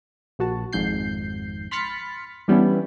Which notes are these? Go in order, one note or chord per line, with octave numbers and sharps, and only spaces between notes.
A#1 F#4 A5
G#1 F2 G#2 G6 C7
B5 C6 F6 A6 B6 C#7
E3 G3 B3 C#4 D4 E4